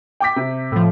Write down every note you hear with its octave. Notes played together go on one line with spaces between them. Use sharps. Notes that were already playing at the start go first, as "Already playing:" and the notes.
G5 D6 B6
C3
A2 F3